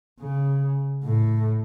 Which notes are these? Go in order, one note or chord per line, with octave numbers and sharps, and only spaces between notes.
C#3
A2